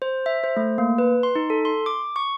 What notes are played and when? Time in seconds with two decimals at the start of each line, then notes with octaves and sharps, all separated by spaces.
0.02 C5
0.26 E5
0.44 C5
0.57 A3
0.78 A#3
0.98 B4
1.23 C6
1.35 D#4
1.50 A4
1.65 C6
1.86 D6
2.16 C#6